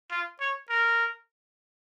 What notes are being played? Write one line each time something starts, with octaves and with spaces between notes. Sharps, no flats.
F4
C#5
A#4